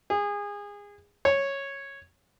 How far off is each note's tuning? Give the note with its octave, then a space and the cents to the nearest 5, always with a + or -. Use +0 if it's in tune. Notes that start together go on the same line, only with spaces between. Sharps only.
G#4 -25
C#5 -5